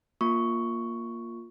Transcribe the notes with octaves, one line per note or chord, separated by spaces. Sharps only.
A#3 F4 C#6